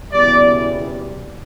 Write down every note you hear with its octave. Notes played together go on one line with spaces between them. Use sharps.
F#1 E2 B2 G3 D5